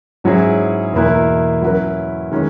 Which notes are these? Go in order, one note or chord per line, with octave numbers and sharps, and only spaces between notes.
G#2 F#3 C#4 E4 G#4
E2 B2 A#3 E4 B4
F#3 C#4 E4 B4
D#3 G#3 C#4